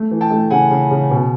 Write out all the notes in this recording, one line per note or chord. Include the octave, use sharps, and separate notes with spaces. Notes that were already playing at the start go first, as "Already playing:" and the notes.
Already playing: A3
E3
G5 A5
A3
C#3 F#5 G#5
C#3
C#3
B2